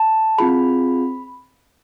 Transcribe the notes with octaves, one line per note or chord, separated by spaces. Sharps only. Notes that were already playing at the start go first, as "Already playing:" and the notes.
Already playing: A5
C4 F4 G#4 B5